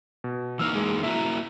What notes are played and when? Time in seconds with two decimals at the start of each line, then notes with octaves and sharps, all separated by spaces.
0.24 B2
0.59 E3 A#3 D#4 E6 F6
0.75 G#3
1.03 A#3 E4 F#4 E5